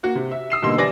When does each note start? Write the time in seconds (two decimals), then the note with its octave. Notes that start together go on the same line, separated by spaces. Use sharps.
0.03 A#3 F#4
0.15 C3
0.31 E5
0.50 D#6 E6 C7 E7
0.62 B2 D3 G3 A#3 D#4 C6
0.78 E3 G3 D5 G#5 A#6